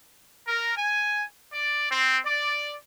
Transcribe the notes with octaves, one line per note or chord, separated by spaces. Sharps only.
A#4
G#5
D5
C4
D5